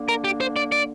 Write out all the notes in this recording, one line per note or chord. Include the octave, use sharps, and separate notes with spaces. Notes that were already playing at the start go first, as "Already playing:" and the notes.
Already playing: D3 A#3 D4
A#4
G4
C5
D5
D5